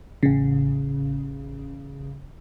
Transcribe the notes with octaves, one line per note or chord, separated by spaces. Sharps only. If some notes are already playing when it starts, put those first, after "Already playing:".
A1 C#3